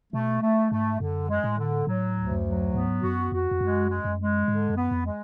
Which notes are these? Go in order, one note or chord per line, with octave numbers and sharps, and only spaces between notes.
B2 A3
A3
G#2 A3
F#2 D3
G#3
A2
D3
A2 F#3
D2
F#2
F#3
G#2 B3
F#2 F#4
F2 F#4
F2
F#2 G#3
G#3
F#2
G#3
G#2 D3
F#2
B3
F2
G#3